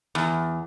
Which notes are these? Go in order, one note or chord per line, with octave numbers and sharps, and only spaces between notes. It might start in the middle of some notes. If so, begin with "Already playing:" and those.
E2